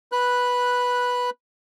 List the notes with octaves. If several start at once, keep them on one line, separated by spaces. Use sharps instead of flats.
B4 F#6